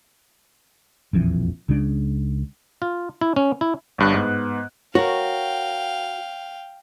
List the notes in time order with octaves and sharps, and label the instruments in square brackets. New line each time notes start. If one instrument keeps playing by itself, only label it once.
[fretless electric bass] E1 A#1 F2 E3
C#2 C#3 G#3 D4
[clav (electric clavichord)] F4
E4
C#4
E4
[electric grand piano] G1 G2 F#6
G#2 B3
[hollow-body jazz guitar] F#4 A#4 [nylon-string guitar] C#5 [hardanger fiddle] F5 G5